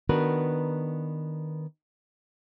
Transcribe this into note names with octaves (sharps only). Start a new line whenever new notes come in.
D#3 B3 D4 F#4 A#4 B4